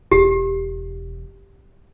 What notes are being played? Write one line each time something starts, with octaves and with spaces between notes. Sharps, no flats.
E1 G4